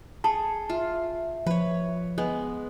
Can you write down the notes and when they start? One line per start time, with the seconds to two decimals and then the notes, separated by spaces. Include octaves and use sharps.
0.24 G#4 A4 A5
0.70 F4 E5
1.47 F3 B4 C#5
2.18 G#3 B3